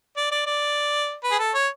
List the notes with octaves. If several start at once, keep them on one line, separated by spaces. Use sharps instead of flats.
D5
D5
D5
B4
G#4
A4
C#5